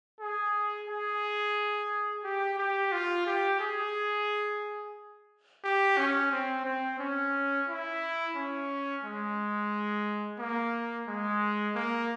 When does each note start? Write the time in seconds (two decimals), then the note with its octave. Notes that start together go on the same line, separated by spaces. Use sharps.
0.20 G#4
0.89 G#4
2.24 G4
2.59 G4
2.92 F4
3.26 G4
3.60 G#4
5.64 G4
5.98 C#4
6.32 C4
6.65 C4
6.99 C#4
7.68 E4
8.35 C#4
9.04 G#3
10.39 A#3
11.08 G#3
11.75 A#3